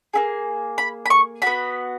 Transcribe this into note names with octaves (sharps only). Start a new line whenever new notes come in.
A#3 E4 G#4
B5
B5
C#6
B3 F#4 B5